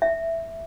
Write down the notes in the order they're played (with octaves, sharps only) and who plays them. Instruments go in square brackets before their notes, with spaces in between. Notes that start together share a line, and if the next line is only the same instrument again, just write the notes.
[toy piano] E5